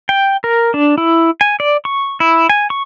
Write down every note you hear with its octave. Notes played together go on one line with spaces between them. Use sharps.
G5
A#4
D4
E4
G#5
D5
C#6
E4
G#5
C#6